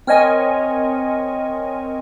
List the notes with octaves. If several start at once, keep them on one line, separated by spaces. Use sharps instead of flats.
C4 A#4 C#5 D#5 G#5